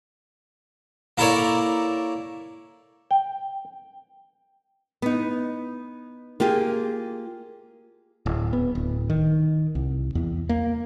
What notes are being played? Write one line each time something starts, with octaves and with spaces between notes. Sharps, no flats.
A#3 E4 A4 A#4 C#5 D5
G5
B3 D#4
A#3 F4 G4 G#4
D1
B3
D1
D#3
C2
E2
A#3